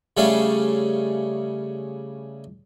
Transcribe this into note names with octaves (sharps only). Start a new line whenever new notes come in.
C#3 G3 A3 C#4 F5